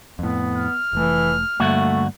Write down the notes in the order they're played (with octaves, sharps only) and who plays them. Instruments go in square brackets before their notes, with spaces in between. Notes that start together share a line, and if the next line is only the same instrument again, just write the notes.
[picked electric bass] F2 A2 [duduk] B3
[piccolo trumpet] F6
[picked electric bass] F1 A3 [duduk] E3
[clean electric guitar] D2 G2 F#4 [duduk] A3 [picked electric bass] A#3